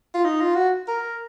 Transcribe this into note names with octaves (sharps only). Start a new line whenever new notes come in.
F4
D#4
F4
F#4
A#4